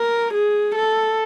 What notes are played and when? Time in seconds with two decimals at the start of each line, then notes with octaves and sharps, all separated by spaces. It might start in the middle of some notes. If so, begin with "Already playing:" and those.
Already playing: A#4
0.34 G#4
0.75 A4